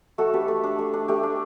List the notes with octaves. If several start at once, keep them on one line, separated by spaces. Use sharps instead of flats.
A3 F#4 A4
D4 G4 B4
A3
D4
A3
D4
A3 G4
D4